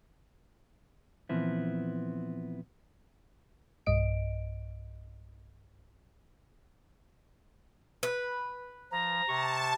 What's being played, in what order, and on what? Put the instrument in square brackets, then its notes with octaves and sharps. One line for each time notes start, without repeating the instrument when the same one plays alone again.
[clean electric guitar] A#2 E3 F3 B3 C4 E4
[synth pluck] B1 G2 D#5 D7
[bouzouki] B4
[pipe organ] F3 [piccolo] A#5
[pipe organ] C3 C#6 [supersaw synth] A5